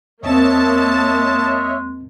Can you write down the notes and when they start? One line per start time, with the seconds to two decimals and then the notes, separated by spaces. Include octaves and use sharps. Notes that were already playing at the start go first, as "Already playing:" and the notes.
0.23 E2 G#3 A#3 C4 C#5 D#5 E5 A5